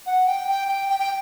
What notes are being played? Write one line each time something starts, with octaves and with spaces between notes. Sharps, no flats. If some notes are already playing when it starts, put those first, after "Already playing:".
F#5
G5
G5
G5
G5
G5